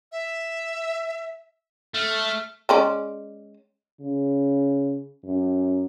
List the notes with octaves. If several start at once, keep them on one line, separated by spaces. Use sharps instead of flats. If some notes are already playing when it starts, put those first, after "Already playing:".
E5
A3 F6
G#3 C#4 D5
C#3
F#2